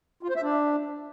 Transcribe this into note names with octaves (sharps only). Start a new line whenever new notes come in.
F4
C5
E5
D4